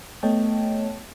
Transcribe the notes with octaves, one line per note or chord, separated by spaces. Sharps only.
A3 B3 C#5 D#5 G5 A5